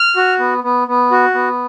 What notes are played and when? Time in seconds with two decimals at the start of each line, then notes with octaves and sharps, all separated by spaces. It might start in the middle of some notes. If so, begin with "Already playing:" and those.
Already playing: F6
0.16 F#4
0.39 B3
0.64 B3
0.88 B3
1.11 F#4
1.34 B3